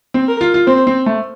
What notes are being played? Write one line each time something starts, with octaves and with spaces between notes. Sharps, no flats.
C4
A#4
F4
F4
C4 C5
C4
A3